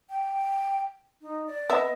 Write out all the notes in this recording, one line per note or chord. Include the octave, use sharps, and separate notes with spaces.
G5
D#4
D5
B3 D#5 E5